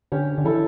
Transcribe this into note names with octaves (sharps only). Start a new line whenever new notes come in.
D3 C#4 G4 C#5
D3
E3 E4 A4 E5